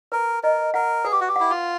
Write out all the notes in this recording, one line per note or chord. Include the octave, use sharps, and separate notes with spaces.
A#4 B4
A#4 D#5
A#4 F#5
G#4 B4
G4
F#4
G4
E4 F#5
F4